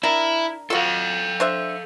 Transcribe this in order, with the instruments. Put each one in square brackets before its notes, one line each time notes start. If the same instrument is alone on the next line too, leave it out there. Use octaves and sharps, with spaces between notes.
[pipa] D4 A#4 [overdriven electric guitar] E4
[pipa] F4 F#4 [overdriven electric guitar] A4 F5
[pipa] D4 C5 E5